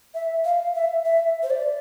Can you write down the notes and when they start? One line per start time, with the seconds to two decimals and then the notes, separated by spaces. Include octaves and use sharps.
0.14 E5
0.45 F5
0.75 E5
1.05 E5
1.43 C5
1.50 D5